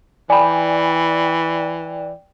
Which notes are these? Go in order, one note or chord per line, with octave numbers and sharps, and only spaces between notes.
E3 D5 G5 G#5 B5